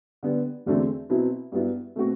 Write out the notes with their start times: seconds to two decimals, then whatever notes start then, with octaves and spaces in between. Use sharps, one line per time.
0.23 D3 G3 B3
0.66 E2 D3 F#3 A3 C4
1.10 B2 F#3 C4 E4
1.52 G2 F#3 B3 E4
1.95 B2 A3 C4 F#4